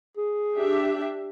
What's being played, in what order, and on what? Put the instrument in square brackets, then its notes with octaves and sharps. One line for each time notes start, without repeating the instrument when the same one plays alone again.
[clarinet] G#4
[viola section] D4 G4 E5